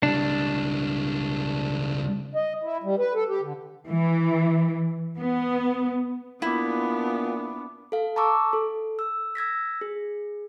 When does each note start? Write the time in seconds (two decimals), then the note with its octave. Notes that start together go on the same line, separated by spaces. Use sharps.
0.03 C#2 G3 D4
2.35 D#5
2.63 E4
2.84 G3
2.98 B4
3.14 A4
3.29 G4
3.42 D3
3.88 E3
5.18 B3
6.42 A#2 B3 D4 E4 B5 D6
7.92 A4 F5
8.16 A5 A#5 C#6 D6 E6
8.53 A4
8.99 E6
9.35 E6 G#6 A#6 B6
9.81 G#4